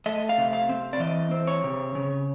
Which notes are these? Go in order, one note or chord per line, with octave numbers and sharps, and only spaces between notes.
A3 D#5
F5
C3
F5
C4
D5
E3 D#5
C4
C#5
C3
C#3